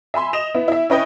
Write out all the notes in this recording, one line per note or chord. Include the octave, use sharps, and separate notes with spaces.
E5 G#5 B5 C6
D#5 E7 F7
B3 E4
E4 E5
C#4 E4 B4 D#5 G5